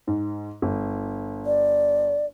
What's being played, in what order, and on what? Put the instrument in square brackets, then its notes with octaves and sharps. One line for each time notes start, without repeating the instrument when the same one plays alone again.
[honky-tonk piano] G#2
G1
[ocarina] D5